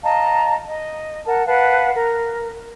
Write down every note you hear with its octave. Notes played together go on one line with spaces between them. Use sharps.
D#5 F5 A5 A#5
D#5
A#4 F#5 A5
B4 F5 F#5 A5
A#4